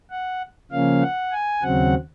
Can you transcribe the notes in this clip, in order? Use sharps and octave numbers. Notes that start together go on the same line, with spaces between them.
F#5
C#3 F3 A#3 C#4 F5
F#5
G#5
D#2 C#3 F#3 C4 F#5